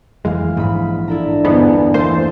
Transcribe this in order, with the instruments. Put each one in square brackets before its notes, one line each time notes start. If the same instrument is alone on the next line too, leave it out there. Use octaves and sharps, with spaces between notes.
[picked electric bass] F#1 F2 G#3 [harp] E3 F5
[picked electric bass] A#1 [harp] G#2 B5
[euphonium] D4 [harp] E4 A4 A#5
[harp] G1 E2 [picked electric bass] G#2 [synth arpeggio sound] B3
[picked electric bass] E3 A#3 [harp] A3 A5 [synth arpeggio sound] C5